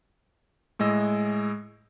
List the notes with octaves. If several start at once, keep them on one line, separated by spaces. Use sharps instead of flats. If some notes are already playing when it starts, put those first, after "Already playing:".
A2 G#3 D#5 E6